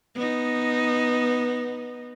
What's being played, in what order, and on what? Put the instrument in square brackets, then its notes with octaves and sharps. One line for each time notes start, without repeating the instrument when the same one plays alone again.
[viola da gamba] B3 D#4